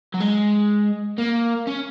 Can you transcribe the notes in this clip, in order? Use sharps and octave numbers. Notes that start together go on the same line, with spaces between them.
F#3
G#3
A#3
C#4